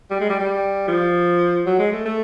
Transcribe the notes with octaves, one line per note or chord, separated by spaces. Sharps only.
G3
G#3
G3
G3
F3
F#3
G#3
A3
A3